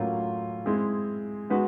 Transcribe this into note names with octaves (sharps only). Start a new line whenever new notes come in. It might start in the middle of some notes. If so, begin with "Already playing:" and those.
Already playing: A2 F#3 A#3 C#4 F4
G#3 C4 E4 G#4
G#3 B3 D#4 F#4 B4